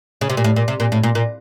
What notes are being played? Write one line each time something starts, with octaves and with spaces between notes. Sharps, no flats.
C#3
C3
A#2
A2
A#2
C3
A#2
A2
A#2
A#2